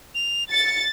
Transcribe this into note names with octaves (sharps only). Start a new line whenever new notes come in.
F7
A6 C#7